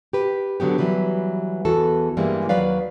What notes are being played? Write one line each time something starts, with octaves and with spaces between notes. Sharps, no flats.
G4 B4
D3 F#3 B3 G4
E3 F#3 G3 B4
E2 E3 F#4 A4
G2 E3 G3 G#3 A#3
D#2 F#3 B4 D5 F5